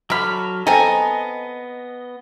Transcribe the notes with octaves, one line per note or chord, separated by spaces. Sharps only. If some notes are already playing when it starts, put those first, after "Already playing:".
D3 F#3 B5 F6
B3 C4 A4 D#5 G#5 A#5